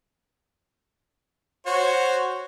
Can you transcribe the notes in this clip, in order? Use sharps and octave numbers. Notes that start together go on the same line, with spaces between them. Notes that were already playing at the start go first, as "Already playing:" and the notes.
F#4 C5 C#5